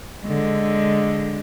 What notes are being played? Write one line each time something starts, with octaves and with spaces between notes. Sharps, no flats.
D3 G#3